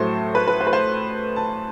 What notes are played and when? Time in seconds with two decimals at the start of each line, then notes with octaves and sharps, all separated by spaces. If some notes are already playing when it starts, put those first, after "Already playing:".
Already playing: A2 F#3 A3 C5
0.35 B4
0.47 B4
0.61 C5
0.67 B4
0.73 C5
1.36 A5